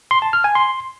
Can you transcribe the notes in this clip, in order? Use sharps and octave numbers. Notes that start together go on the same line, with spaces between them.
C6
A5
F6
G#5
C6